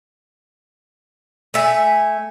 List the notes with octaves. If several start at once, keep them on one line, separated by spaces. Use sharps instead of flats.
A3 E5 G#5